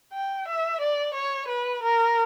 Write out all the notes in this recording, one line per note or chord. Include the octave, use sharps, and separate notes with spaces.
G5
E5
D5
C#5
B4
A#4